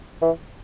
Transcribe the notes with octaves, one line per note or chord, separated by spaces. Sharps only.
E3